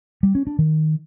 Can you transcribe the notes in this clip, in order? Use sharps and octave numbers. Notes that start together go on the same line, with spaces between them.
G3
C#4
D4
D#3